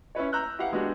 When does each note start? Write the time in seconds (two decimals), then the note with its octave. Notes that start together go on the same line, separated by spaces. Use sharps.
0.15 C#4 E4 B4 C#5
0.32 A#5 E6 F#6 G6
0.58 E4 G4 B4 F5 F#5
0.72 G#3 B3 D4 F#4 G4